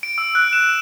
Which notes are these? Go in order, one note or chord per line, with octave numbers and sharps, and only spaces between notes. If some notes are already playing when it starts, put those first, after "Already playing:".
D7
E6
F#6
E7